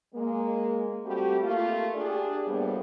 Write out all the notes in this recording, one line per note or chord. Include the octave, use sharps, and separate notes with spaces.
G#3 A#3
G3 A3 C4 F#4 G4
A3 A#3 F4
D4 G4 G#4 D5
F2 A2 G3 A#3 B3